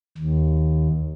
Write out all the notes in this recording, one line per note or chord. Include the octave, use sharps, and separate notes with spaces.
D#2